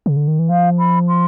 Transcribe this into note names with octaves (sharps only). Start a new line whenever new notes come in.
C#3
D3
D#3
E3
F3 F5
B5
C6